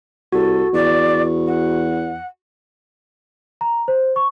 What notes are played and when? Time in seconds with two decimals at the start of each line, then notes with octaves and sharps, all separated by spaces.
0.32 C2 F#4 A4
0.73 E2 D5
1.47 F#5
3.61 A#5
3.88 C5
4.16 C#6